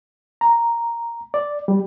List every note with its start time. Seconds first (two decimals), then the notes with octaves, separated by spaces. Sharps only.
0.41 A#5
1.34 D5
1.68 G3